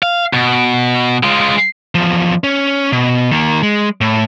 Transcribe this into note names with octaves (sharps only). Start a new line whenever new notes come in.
F5
B2
G#3 F4
E2 F3
C#4
B2
D#3 A#3
G#3
A2